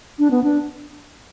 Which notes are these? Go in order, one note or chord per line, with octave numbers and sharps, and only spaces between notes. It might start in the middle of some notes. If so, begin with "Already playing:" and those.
D4
B3
D4